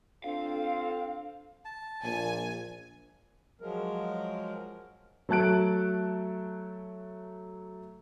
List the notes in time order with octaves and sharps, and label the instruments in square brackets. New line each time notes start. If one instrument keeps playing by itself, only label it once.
[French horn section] C4 F4 [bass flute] D4 [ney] A4 [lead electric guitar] F5
[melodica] A5
[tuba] A#1 [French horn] A#2 [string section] G#5
[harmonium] F3 F#3 G#3 A#4
[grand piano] F#3 A3 A5 F#6 D7